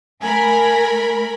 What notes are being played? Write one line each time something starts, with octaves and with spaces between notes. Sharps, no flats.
A3 A#4 G#5 B5